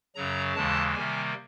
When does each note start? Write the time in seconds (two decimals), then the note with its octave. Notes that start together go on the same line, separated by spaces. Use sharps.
0.15 F#2 C#3 F#3 A#5
0.55 D#2 C#3 E3 G#3 A5
0.94 C3 D#3 G3 A#3 G#5